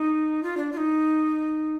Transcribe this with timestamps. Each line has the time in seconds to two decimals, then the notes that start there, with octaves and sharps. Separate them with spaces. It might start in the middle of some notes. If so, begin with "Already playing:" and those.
Already playing: D#4
0.43 F4
0.57 D4
0.73 F4
0.77 D#4